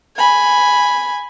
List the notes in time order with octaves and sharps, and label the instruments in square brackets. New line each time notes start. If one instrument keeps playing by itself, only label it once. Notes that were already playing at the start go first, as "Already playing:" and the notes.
[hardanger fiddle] G#5 B5